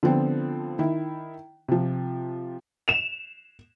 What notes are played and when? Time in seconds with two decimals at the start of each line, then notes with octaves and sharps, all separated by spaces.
0.03 D3 F3 B3 C4
0.79 D#3 E4
1.68 C3 F3
2.88 E7 F7